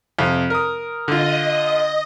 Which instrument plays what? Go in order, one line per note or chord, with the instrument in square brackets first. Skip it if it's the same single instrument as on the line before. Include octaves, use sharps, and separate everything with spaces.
[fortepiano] F2 C3
A#4 D#6
[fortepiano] D3 F4 [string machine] D#5